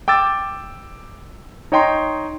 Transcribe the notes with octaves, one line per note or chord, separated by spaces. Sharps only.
G5 D6 E6 A6
D#4 C#5 D#5 G5 A#5 C6